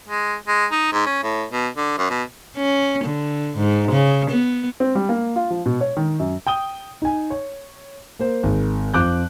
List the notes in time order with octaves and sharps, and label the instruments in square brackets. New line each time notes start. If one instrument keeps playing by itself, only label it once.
[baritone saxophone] G#3
G#3
D#4
G#2
C#4
A2
B2
D3
F#2
B2
[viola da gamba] C#4
D3
G#2
C#3
B3
[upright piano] C4
G3
A#3
F4
F3
B2
C#5
D#3
F#2
[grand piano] G5 D#6 G7
D#4 G#5
C#5
A#3 C5
G#1
F2 F3 D6 F#6 G6